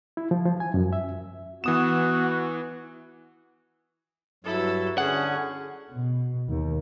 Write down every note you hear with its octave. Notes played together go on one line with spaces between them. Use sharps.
E4
F3
F3
G#5
F#2
E5
E3 B3 F#4 D#6 E7
G2 F#3 E4 A4
D3 C#4 G#4 F#5
B2
D#2